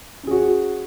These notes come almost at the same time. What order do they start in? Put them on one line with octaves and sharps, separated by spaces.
C#4 G#4 F#4